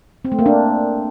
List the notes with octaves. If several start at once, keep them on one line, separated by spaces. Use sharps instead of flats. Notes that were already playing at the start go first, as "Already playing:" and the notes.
C4
A3
A#3
D4